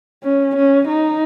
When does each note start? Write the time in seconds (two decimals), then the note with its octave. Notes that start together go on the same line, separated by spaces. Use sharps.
0.24 C#4
0.56 C#4
0.88 D#4